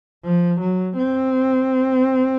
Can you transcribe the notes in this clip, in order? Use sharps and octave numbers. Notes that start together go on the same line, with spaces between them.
F3
F#3
C4